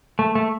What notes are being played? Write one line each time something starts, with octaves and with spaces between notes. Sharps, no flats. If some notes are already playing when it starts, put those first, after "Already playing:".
A3
A3